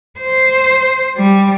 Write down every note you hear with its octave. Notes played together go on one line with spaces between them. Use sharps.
C5
G3